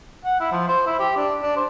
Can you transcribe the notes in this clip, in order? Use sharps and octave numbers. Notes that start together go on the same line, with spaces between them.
F#5
E4
F3
C5
E4
G4
D4
D4
C5